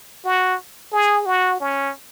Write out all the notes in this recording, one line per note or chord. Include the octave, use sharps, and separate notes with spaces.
F#4
G#4
F#4
C#4